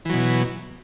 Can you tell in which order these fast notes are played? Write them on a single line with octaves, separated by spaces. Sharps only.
E3 F#3 B2